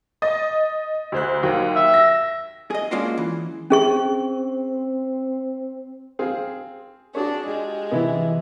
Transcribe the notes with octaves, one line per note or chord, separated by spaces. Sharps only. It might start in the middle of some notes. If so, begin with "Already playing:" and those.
D#5 D#6 A6
D2 C5 F#6
D#2 F#3
E5
A#6
G#4 D#5
G#3 A#3 C#4 D4 F4 F#4
E3
C4 C#4 G#4 C#6
C4 G#4 F5
D4 F#4 G#4 C#5
G#3 F4 G4
C3 E3 B3 E4